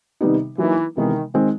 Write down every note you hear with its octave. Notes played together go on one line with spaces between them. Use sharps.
C3 D#3 G3 B3 D#4
E3 F#3 A#3 D#4
C3 D#3 E3 G#3 B3
D#3 G#3 C4